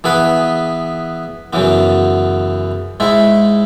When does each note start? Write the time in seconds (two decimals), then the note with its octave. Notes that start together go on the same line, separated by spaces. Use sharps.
0.04 E3 B3 G#4 B4
1.53 F#2 C#3 E3 B3
3.00 G#2 G#3 E4